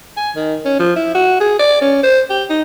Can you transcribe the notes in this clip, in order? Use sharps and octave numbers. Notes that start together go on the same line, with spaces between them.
G#5
D#3
C#4
F3
E4
F#4
G#4
D5
C#4
C5
G4
D#4